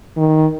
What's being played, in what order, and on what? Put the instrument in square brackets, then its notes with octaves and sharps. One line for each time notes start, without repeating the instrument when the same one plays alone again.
[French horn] D#3